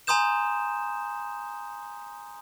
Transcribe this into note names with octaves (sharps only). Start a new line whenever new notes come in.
G#5 A#5 C6 D#6 G6 E7